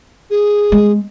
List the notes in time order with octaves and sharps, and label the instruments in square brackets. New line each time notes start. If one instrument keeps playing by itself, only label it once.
[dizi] G#4
[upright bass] G#3